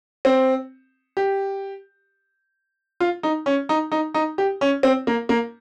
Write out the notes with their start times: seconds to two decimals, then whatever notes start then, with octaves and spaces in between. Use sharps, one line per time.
0.25 C4
1.17 G4
3.00 F4
3.23 D#4
3.46 C#4
3.69 D#4
3.92 D#4
4.14 D#4
4.38 G4
4.61 C#4
4.83 C4
5.07 A#3
5.29 A#3